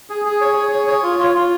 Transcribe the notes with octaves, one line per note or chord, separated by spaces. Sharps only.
G#4
G#4
C#5
G#4
C#5
C#5
F4
F4
F4